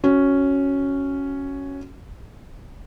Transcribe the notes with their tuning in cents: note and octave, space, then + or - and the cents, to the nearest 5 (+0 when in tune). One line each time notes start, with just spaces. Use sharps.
C#4 +0 F#4 +0